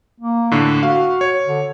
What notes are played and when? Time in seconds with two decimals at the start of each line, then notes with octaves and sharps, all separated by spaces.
0.20 A#3
0.51 A2 D3
0.83 F#4 F5
1.21 C#5
1.47 D3